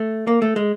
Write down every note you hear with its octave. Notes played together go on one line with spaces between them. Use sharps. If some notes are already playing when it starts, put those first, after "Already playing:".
Already playing: A3
A#3
A3
G#3